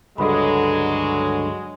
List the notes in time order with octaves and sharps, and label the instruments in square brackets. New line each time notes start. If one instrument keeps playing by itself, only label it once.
[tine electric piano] C#2 G2 D3 [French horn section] F#3 G#3 [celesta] A4 B5